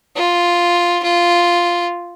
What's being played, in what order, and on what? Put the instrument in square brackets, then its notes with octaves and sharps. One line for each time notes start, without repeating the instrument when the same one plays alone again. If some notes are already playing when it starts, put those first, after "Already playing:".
[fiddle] F4
F4